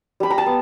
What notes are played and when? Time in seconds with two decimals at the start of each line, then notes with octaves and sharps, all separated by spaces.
0.20 G3 B5
0.30 A#5
0.38 A5
0.46 B3